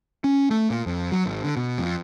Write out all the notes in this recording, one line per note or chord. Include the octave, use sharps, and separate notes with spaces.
C#4
A3
A#2
F2
F#3
G#1
D3
B2
F2